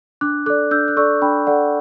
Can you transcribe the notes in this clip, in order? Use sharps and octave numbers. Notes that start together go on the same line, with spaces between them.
D4 D6 F#6
A4 D5 D6 F#6
D4 E6 G6
F#6
A4 D5 C#6 E6
D4 G5 B5
A4 D5 F#5